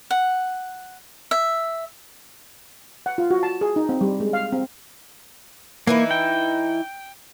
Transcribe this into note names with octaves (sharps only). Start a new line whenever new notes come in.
F#5
E5
F#5
F4
F#4
A5
G#4
D#4
C4
G3
G#3
F5
C4
E3 A#3 D#4 E4
G5